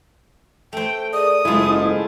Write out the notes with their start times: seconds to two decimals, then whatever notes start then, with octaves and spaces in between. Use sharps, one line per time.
0.73 A3 C5 G5
1.13 G#4 A#4 D5 D#6
1.45 F#1 G#2 G#3 A3 E4 F4